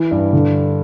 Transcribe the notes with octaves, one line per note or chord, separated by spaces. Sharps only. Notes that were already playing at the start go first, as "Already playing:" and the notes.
Already playing: E3
G2
D3